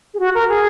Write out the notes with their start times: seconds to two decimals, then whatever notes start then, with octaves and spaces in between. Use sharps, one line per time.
0.14 G#4
0.19 F#4
0.35 A#4
0.49 G#4